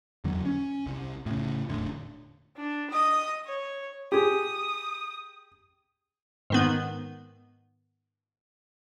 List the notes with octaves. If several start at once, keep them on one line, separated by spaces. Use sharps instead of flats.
E2 D3 F#3 A#3
C#4
C2
A2 C#3
E1 B1 A2 D3
D4
D#5 D#6
C#5
G4 G#4 D#6
G#2 D#3 B3